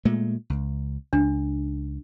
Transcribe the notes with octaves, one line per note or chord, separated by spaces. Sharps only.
A#2 G#3 A3
C#2
C#2 D4